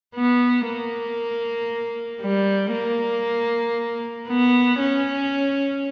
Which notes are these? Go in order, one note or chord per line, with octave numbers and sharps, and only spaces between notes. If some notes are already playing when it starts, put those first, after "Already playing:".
B3
A#3
G3
A#3
B3
C#4